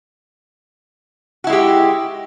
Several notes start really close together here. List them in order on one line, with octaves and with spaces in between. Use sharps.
F#4 E4 G#3 G4